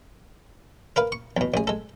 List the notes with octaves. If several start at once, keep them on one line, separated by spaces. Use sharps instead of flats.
A#4 B4 F5
C#6
E2 B2
A1 G#4
G#3 A4